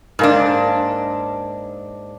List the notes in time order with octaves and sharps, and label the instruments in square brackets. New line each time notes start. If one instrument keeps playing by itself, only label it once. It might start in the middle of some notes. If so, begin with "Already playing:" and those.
[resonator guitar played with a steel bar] G#2 A#3 D4